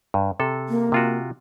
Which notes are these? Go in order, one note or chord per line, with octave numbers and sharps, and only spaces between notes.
G2
C3 A4
A#3
C3 F4 F#4